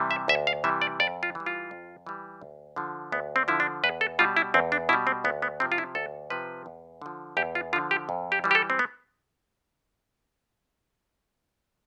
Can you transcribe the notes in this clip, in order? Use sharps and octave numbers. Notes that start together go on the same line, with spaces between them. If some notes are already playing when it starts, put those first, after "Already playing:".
Already playing: C3 E3 G3
E5
D2 E5
F5
C3 E3 G3 E5
D5
F2 D5
F4
E3 G3
F4
F2
E3 G3
D2
D3 F3
D2 B3
C4
D3 F3 E4
D4
E2 B4
A4
B2 G3 F4
E4
E2 C4
D4
B2 G3 E4
C4
D2 B3
B3
C3 F3 C4
F4
E4
D2 A4
C3 F3 B4
E2
D3 F3
E2 G4
F4
D3 F3 F4
G4
F2
G4
E3 G3
G4
A4
C4
B3